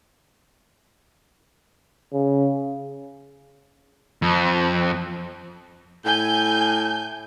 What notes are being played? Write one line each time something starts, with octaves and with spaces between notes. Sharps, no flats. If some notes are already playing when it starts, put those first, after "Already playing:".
C#3
F2
A2 G#5 G6